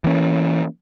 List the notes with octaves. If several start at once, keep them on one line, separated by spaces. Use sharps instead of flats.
E3 A#3 C#4